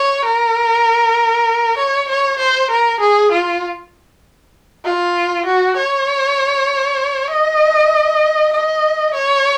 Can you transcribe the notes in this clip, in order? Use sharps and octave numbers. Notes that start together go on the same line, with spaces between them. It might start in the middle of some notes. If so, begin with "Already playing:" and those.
Already playing: C#5
A#4
C#5
C#5
C5
A#4
G#4
F4
F4
F#4
C#5
D#5
D#5
C#5